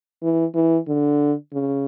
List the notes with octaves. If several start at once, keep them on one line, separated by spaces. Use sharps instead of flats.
E3
E3
D3
C#3